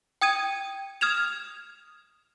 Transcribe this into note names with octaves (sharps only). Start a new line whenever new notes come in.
G5 D#6 G#6 D#7
D#6 F6 G#6 E7 F7